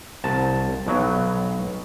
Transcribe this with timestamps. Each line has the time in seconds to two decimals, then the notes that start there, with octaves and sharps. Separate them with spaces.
0.24 C2 A5
0.87 B1 B2 F#3